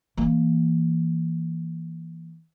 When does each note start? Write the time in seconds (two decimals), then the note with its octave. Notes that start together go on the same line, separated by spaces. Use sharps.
0.17 E3 A#3